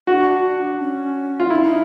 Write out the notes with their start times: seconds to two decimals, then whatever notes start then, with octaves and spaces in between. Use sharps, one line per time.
0.07 D4 F#4
0.79 C#4
1.40 F4
1.50 D4 E4
1.64 D#4